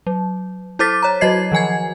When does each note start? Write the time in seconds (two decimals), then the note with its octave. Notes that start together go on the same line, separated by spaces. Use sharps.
0.07 F#3
0.79 E4 A4 C5 D6 A6 B6
1.03 C#5 A#5
1.21 F#3 F#4 D#5 G#6 C7
1.52 D#3 F3 G#5 G#6